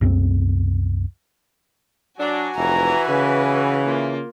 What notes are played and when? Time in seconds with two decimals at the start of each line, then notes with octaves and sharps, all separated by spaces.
0.01 C2 F#2 F#3 C4
2.19 F#3 D4 F#4 G#5
2.57 F1 E3 A#5
3.09 C#3 B4
3.84 A#3 F4